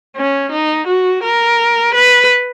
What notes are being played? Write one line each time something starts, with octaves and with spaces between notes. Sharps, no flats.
C#4
D#4
F#4
A#4
B4